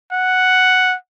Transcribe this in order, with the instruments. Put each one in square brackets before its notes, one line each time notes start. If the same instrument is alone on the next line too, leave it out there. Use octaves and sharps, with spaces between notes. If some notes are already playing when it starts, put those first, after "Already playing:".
[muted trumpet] F#5